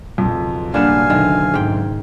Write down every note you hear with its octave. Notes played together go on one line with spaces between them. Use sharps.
B1 F2 C#3
G2 A#3 D4 B4 F5 F#5 G#5 E7
F#1 D3 D#3
G#2 G5